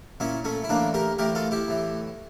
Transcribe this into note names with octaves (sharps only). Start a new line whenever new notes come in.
A#2 C#4 E4
A3 C#4
E4
A2 E3 A#3 D4
G4 A#4
A2 E3 G4 A#4
F4 A4
E4 G4
A2 E3